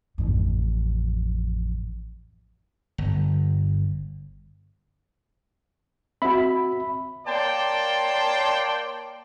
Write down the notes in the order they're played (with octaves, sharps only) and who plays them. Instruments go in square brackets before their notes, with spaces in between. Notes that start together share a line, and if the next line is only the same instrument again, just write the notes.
[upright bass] A1 F2
[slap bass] G1
[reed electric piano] C4 F#4 [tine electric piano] E5 B5
[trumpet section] A#3 C#5 D5 G5 A5 C6